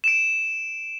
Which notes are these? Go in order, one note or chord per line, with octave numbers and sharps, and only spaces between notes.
D7 E7